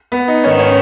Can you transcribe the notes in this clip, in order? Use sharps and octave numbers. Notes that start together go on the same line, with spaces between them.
B3
D#4
G#2 D#3 B3 C#4
C#4